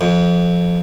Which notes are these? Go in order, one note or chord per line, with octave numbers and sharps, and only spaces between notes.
F2